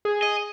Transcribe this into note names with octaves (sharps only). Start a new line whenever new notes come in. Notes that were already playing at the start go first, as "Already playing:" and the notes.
G#4
D#5